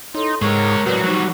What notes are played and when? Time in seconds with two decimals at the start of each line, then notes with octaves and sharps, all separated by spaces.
0.15 D#4 E4 A4 C#5 C6
0.42 G#2 G#3 A#4 C#5 C#6
0.86 A2 F#3 F#4 B4 D5
1.04 F#3 G3 D#4 C5 A#5